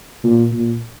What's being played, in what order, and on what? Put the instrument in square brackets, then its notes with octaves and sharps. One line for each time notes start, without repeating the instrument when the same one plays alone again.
[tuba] A#2
A#2